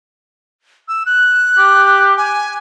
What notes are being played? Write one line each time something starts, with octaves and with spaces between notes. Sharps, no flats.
E6
F#6
G4
G#5